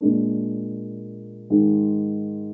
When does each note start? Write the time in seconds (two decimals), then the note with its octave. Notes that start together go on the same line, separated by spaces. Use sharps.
0.01 A#2 G#3 D4
1.50 G#2 D#3 G#3